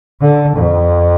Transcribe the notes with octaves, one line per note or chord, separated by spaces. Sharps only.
D3
F2